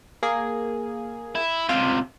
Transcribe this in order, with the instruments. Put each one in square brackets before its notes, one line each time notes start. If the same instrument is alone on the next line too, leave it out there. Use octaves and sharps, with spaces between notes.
[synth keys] A#3 G#4
[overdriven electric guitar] E4
[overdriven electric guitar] C#2 C3 [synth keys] F4